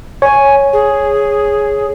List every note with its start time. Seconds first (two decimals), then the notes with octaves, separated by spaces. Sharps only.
0.22 C#5 G#5
0.73 G#4